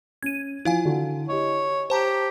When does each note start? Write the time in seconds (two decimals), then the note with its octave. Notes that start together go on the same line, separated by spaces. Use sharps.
0.23 C#4 G#6 D#7
0.65 F3 E4 F5 G#5
0.85 D3 F#4
1.29 G4 C#5 D#5
1.90 G4 C5 A5 A#5